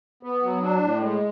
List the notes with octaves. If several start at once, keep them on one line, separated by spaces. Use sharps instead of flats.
B3
F#3
D4
A2
G#3